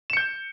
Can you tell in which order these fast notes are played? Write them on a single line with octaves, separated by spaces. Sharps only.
E7 C#7 G6